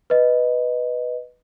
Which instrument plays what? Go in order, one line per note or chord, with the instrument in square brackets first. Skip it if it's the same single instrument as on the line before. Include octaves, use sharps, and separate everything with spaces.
[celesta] B4 D#5